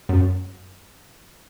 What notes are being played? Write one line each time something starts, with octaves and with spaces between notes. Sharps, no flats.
F#2